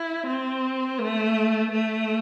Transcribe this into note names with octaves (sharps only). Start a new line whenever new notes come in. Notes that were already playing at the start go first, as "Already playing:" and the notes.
Already playing: E4
C4
A3
A3